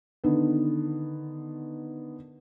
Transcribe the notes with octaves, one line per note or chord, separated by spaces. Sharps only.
D3 D#3 B3